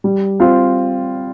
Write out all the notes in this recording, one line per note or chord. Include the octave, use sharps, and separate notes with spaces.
G3
C4 F4